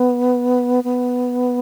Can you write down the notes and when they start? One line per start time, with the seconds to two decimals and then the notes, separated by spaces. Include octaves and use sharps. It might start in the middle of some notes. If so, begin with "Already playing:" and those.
Already playing: B3
0.84 B3